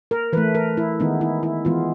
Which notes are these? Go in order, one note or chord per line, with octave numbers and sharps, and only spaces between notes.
A#4
E3 A3 B4
A#4
E4
D#3 G#3 B3 D#4
E4
E4
E3 G#3 B3 F4